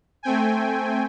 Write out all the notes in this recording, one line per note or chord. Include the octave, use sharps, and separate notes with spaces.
A3 C4 G5 G#5